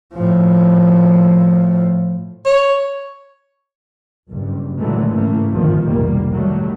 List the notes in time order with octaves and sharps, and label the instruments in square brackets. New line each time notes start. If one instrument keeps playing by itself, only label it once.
[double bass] A2 F3
[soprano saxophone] C#5
[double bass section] F#1 G2
A#2 D3 E3 F#3 G#3 A3
G#1 A2 C#3 E3 A3 A#3
G1 D#2 A#2 D#3 F3
F1 B1 G3 A#3
A2 D#3 F#3 G3 A3